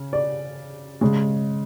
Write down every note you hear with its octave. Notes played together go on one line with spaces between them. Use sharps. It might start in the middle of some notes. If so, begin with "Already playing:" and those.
Already playing: C#3
D5
C#3 G#3